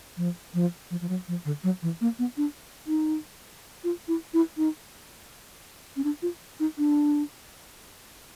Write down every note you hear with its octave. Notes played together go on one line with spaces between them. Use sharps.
F3
F3
F3
F3
F#3
F3
D3
F#3
E3
A#3
B3
D4
D#4
F4
E4
E4
D#4
C#4
D4
F4
D#4
D4